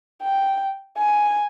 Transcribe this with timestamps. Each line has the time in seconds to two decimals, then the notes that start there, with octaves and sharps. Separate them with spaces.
0.22 G5
0.97 G#5